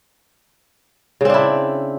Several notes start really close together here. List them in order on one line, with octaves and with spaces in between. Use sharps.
C#3 C4 D4 E4